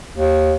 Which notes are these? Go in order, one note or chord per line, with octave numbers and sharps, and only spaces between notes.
D#2